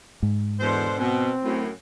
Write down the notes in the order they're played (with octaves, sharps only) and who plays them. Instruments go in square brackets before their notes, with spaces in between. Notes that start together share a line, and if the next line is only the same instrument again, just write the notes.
[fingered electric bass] G#2
[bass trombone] E2 [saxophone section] B2 D3 C5
[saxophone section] B2 [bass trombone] C4
[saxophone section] F#2 A2